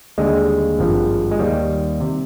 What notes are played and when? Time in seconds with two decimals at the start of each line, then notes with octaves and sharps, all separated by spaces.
0.18 D#2 D3 G3 G#3
0.79 G#1 G2 F3
1.31 G#3
1.39 D#2 D#3 G3
2.00 C3